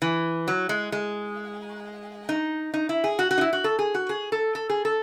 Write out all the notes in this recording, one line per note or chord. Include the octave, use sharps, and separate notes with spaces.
E3
F#3
G#3
G#3
D#4
D#4
E4
G#4
F#4
F#4
D#4
E4
F#4
A4
G#4
F#4
G#4
A4
A4
G#4
A4